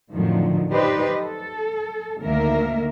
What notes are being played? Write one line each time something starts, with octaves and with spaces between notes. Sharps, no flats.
F2 A2 D3 D#3 F3 F#3
D#4 G4 B4 C5 D5 D#5
A4
D2 D#3 A#3 A#4 E5